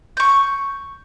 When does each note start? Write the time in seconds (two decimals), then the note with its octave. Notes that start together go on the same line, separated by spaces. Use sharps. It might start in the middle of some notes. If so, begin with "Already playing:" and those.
0.17 C#6 G6